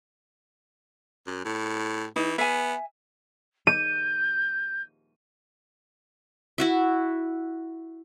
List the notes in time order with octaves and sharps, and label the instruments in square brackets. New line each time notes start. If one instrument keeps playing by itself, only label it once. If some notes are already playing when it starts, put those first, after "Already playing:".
[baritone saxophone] F#2
A2
[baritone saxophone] E3 [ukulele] D#4
[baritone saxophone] B3 [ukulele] E5 G#5
[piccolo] G6 [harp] D#7
[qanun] E4 F#4 E5